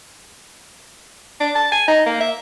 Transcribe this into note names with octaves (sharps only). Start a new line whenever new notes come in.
D4
A5
G#5
D#4
A#3
E5